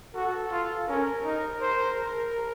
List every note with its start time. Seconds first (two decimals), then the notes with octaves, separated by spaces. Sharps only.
0.14 F#4 A4
0.51 F4
0.88 C#4 A#4
1.25 D#4
1.62 C5